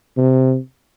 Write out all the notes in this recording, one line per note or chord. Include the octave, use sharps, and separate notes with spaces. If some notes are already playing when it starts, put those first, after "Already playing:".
C3